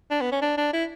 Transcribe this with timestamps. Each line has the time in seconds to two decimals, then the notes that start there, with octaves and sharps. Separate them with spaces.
0.11 D4
0.21 B3
0.32 C#4
0.42 D4
0.58 D4
0.73 E4